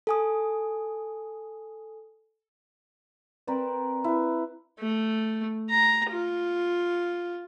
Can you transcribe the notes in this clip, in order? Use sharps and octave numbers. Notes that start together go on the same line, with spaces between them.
A4 G#5 D#6
C4 A#4 B4 D5
E4 B4
A3
A#5
F4